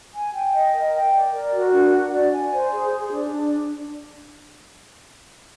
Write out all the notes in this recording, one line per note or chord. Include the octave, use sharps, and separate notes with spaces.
G#5
G5
D#5
A#4
G5
D5
A#4
F#4
D4
F#5
D5
G#5
C5
G#4
G#4
D4
D4